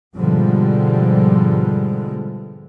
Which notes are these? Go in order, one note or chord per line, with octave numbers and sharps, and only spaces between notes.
G#2 B2 D3 F3 G3 G#3